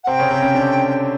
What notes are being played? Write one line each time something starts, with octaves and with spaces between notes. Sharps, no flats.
F#5
C3 C4 G5
C#3 C#4
C3 C4
C#3 C#4
D3 D4